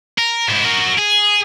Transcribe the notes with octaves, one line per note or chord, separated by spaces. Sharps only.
A#4
G#2 E4
F#4 A#4
G#4